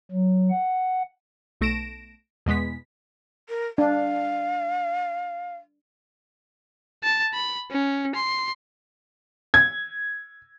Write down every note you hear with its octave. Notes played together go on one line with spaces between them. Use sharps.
F#3
F#5
B1 A3 A#6 D7 E7
E2 B2 G#3 B3 B6
A#4
D4 F5
A5
B5
C#4
C6
G#6